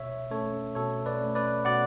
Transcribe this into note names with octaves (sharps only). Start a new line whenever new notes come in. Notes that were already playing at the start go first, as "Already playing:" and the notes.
Already playing: B2 C#5 E5
A3 C#4 A4 C#5
B2 A4 C#5
B4 D5
A3 C#4
B4 D5
B2 D5 F#5